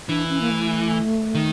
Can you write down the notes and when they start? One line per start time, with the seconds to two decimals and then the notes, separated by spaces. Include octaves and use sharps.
0.08 E3 D4
0.29 C#4
0.41 A#3
0.50 A3
1.35 D#3